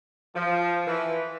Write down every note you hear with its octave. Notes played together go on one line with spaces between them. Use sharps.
F3
E3